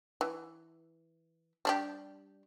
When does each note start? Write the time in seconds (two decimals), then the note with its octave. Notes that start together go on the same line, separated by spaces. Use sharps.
0.21 E3
1.65 G3 D4 G4